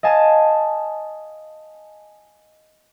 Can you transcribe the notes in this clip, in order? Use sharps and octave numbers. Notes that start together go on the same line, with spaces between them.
D#5 F5 G#5 A5